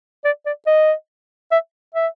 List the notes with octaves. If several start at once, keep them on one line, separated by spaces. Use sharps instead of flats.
D5
D5
D#5
E5
E5